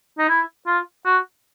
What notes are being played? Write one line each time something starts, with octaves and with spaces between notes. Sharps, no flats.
D#4
E4
F4
F#4